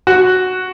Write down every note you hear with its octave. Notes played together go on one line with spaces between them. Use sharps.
F#4